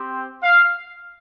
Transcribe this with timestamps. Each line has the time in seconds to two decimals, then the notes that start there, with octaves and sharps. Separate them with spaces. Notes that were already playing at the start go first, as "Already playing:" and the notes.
Already playing: C4 G4
0.43 F5